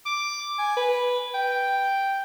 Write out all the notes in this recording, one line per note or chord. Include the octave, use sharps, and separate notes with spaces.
D6
G#5
B4
G5